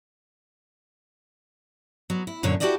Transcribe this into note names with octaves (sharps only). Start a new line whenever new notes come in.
F#3 B3
E4
F#2 A#2 D3 C#5
E4 F#4 G4 A4 D5 D#5